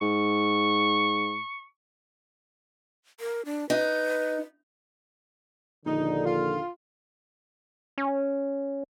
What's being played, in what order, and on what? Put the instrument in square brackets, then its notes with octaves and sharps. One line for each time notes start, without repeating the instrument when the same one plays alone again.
[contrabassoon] G#2 [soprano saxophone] C#6
[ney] A#4
D4
[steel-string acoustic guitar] D#4 [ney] B4
[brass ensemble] A#1 D#2 D3 [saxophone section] D#4
[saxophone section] F4
[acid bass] C#4